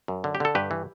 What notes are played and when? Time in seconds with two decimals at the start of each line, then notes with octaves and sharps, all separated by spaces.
0.08 F#2
0.24 D3
0.35 G4
0.40 D3 A4
0.55 G2 G4 B4
0.71 E3